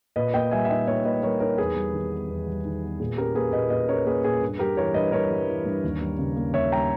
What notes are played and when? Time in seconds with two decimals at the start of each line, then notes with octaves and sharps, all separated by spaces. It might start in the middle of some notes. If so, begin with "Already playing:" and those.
0.16 A#2 B4 D#5
0.34 A#3 D#5 G5
0.51 G3 E5 G#5
0.65 E5
0.69 D#4 D#5 G5
0.87 A#2 C#5 E5
1.05 A#3 B4 D#5
1.23 G3 A#4 C#5
1.40 D#4 A#4 C#5
1.58 E2 G#4 B4
1.76 G3
1.93 D#3
2.11 B3
2.28 E2
2.47 G3
2.65 D#3
2.83 B3
3.00 A#2 G#4
3.17 C#4 G4 A#4
3.35 A#3 G#4 B4
3.53 A#2 B4 D#5
3.70 A#2 B4 D#5
3.88 C#4 A#4 C#5
4.06 A#3 G#4 B4
4.24 A#2 G#4
4.42 G2
4.59 G3 G4 A#4
4.77 E3 A#4 C#5
4.94 G2 B4 D#5
5.12 G2 A#4 C#5
5.31 G3
5.48 E3
5.66 G2
5.84 D#2
6.01 G3
6.19 C#3
6.36 A#3
6.54 D#2 C#5 E5
6.72 G3 G5 A#5